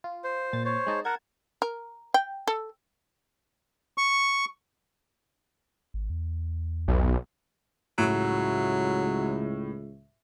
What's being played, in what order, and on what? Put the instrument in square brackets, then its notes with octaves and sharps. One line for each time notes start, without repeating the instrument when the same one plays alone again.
[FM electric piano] F4
[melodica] C5
[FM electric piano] A#2 A6
[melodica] C5 C#5
[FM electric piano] G#3 D#4 A5
[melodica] A#4 F#5 [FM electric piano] A5 G#6
[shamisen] A#4
G5
A4
[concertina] C#6
[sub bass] G#1
E2
[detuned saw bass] B1
[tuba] C#2 [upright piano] A2 [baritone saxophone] F#3